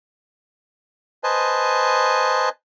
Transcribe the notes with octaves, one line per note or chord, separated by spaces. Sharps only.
B4 C5 D#5 G#5 A5